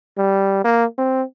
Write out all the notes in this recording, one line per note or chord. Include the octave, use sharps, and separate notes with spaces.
G3
A#3
C4